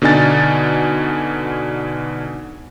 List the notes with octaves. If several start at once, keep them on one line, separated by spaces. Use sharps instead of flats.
B2 D3 D4 D#4 G#5 A6